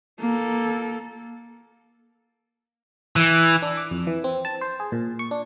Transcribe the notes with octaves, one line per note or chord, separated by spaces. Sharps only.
A#3 A4
E3
D4
D6
F2
E3
C4
A5
C5
G#4
A#2
C#6
D4